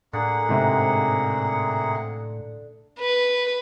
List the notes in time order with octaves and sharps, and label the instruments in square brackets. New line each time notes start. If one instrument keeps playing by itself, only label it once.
[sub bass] A2 [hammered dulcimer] D3 [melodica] A#3 G#4 F#5
[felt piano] G#2 C3
[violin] B4